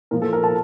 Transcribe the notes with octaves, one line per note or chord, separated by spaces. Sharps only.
A#2 F3 A#4
A4
A#4
A5